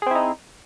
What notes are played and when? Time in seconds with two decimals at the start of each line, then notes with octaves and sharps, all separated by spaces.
0.02 G#4
0.06 C4
0.11 E4
0.15 D#4